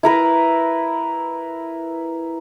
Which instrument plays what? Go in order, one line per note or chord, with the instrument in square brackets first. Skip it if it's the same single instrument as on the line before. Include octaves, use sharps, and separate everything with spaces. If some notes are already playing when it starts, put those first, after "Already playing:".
[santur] E4 A#4 B4